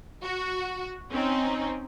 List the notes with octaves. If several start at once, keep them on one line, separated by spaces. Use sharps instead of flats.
F#4
C4 C#4 D#4